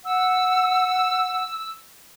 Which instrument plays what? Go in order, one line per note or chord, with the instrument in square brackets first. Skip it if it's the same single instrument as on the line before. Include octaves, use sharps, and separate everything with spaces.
[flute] F#5 [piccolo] E6